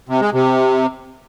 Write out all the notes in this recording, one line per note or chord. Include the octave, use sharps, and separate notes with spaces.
C3
G#3
C3